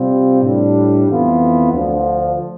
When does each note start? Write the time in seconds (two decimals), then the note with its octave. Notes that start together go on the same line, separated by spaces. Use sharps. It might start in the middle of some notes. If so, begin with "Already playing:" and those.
Already playing: C3 G3 C4 F4
0.42 A2 G3 D4
1.07 F2 E3 B3 F4
1.72 D2 D3 F3